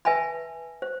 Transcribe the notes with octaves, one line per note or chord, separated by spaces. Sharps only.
B4 E5 G#5 A5 B5
C5